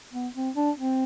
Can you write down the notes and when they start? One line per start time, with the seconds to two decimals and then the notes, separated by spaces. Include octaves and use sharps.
0.13 B3
0.35 C4
0.56 D4
0.78 C4